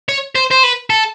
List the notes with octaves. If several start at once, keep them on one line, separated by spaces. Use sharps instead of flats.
C#5
C5
C5
B4
A4